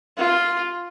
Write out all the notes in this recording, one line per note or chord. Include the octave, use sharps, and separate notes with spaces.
F4